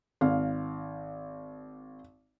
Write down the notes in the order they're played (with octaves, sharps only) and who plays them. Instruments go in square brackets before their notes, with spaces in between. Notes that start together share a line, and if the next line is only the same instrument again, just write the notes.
[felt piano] G#1 F5